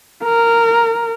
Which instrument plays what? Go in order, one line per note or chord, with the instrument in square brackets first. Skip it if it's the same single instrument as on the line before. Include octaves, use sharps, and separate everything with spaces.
[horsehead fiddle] A#4